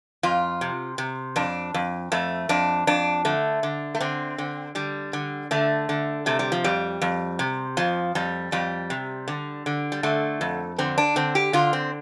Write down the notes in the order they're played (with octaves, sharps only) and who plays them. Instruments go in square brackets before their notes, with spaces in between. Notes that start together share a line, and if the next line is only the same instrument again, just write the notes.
[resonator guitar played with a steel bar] F2 F4
C3
C3
F2 D4
F2
F2 A3
F2 D4
F2 D4
D3 A3
D3
A3
D3 C4
D3
D3 G3
D3
D3 A3
D3
C3 A3
G3
F3
F2 G3
F2
C3
F2 F3
F2 G3
F2 G3
C3
D3
D3
G3
D3 A3
F2
D3 C4
D4
D3 C4
G4
D3 F4
C4